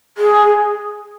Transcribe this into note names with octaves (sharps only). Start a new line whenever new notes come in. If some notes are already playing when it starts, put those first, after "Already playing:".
G#4